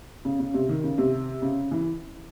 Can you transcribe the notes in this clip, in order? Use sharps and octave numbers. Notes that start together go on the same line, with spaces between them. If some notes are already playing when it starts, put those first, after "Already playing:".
C#3
C#3
C3
D#3
C#3
C3
C#3
E3